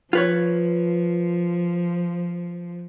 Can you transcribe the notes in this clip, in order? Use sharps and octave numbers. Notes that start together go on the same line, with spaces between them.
F3 F4 B4 C#5